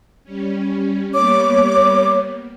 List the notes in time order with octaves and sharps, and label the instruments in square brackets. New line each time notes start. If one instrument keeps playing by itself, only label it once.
[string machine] G3 C#4
[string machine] G3 A#3 B3 [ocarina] C#5 [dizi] D6